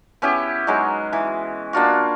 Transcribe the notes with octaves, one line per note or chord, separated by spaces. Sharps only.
B3 C#4 E4 G4
F#3 G#3 D#4 F#4
E3
A#3 D4 F4 F#4